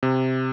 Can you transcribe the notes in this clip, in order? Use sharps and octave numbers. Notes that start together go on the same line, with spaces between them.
C3